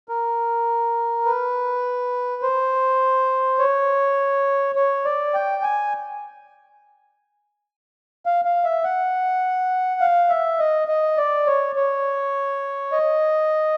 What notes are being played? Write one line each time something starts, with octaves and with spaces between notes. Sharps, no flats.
A#4
B4
C5
C#5
C#5
D5
G5
G#5
F5
F5
E5
F#5
F5
E5
D#5
D#5
D5
C#5
C#5
D#5